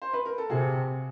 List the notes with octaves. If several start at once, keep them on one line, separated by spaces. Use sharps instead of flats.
C5
B4
A#4
A4
C3 F#4 G#4